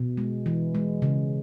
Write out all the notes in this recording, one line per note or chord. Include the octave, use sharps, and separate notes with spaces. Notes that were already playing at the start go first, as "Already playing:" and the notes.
Already playing: B2
G#3
E3
G#3
C#3